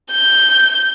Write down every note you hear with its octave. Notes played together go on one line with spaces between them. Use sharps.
G6